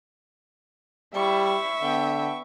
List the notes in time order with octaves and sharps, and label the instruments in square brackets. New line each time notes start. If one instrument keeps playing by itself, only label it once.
[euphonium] G3 [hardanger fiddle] E4 C5 [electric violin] E5 [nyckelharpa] C#6
[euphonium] D3 [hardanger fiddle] B3 G5